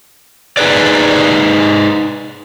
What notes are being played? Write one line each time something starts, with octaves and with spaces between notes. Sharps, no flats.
D#4 G#4 B4 D5